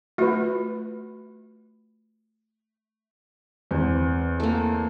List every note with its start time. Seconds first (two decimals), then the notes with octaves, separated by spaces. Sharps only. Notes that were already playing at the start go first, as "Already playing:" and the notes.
0.18 A3 F4 F#4 B4
3.71 E2 C4
4.40 A3 A#3